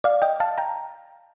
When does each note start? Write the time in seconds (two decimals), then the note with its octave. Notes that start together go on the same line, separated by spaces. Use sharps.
0.04 D5 F5
0.22 D#5 G5
0.40 F5 A5
0.58 G5 A#5